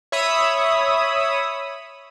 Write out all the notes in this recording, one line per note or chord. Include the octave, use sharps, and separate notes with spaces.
C#5 E5 B5 D#6 E6